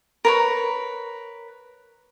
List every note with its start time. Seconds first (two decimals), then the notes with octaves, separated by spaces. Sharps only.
0.25 A#4 B4 C#5